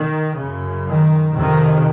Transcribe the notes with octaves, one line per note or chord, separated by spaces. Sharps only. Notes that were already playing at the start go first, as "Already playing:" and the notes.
Already playing: D#3
F#2 C#3
D#3
F2 C3 D#3